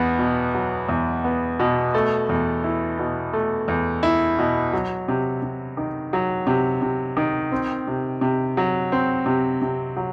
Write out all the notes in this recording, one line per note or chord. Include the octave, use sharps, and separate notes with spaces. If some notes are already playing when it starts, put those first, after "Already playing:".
Already playing: E2 B3
B2
F#3
E2
B3
B2
A3
E2
E4
B2
A3
E2
E4
B2
F#3
C3
C3
D#3
F#3
C3
C3
D#3
C4
C3
C3
F#3
C4
C3
C3
F#3